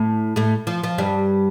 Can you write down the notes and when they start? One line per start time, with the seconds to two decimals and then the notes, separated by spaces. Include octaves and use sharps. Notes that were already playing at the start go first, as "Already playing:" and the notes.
Already playing: A2 A3
0.36 A2 A3
0.67 F3
0.83 F3
0.98 G2 G3